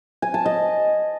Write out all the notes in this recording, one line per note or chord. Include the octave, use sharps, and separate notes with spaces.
G#5
A5
D#5